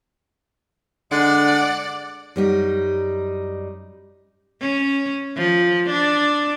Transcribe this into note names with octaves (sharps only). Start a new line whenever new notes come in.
D3 G#3 D5 F#5
F#2 G3 D#4
C#4
F3
D4